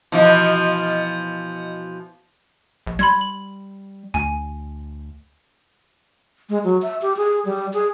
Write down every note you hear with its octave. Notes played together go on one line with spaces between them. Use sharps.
B2 E3 F3
A#1
G3 B5 C6 G#6
F#7
D2 G#5
G#3
F#3
E5
G4
G#4
G3
G#4